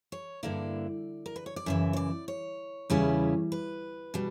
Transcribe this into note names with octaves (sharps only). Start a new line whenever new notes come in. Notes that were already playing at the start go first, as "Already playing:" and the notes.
C#5
G2 D3 A#3 E4 D5
A#4
B4
C#5
D5
F#2 C#3 E3 E5
C#5
D5
C#5
E2 C#3 G3 C#4 E4
B4
B2 G3